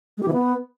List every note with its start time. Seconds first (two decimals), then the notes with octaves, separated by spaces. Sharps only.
0.17 G#3
0.22 G4
0.28 E3
0.33 B3